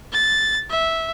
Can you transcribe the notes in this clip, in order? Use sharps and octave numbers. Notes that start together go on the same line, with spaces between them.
A6
E5